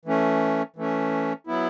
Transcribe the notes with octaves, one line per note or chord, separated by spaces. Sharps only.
E3 A3 C#4
E3 A3 C#4
F#3 B3 E4